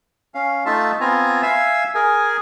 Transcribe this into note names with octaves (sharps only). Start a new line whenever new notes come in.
C#4 F5
A3 D#4 F4 E5 A5
B3 C4 F4 G#5 A#5
E5 F5 G#5 E6
G#4 A#4 G#5